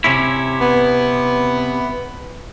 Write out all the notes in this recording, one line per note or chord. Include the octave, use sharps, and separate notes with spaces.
C3 C#4 E4
B3